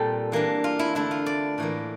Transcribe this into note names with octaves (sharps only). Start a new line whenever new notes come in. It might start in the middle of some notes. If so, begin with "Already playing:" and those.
Already playing: A#2 G3 C4 A4
E3 A#3 D4
F4
E4
D3 A3 D4 E4
F4
D5
A2 E3 A#3